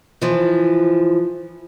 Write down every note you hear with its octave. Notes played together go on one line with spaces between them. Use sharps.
E3 F3